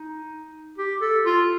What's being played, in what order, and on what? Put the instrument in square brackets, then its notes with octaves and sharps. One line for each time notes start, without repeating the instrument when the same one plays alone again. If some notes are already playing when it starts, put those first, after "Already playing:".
Already playing: [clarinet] D#4
G4
A4
F4